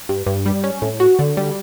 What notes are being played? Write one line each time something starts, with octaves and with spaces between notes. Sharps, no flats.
G2
G2
G3
C#4
A2
F#4
D3
G3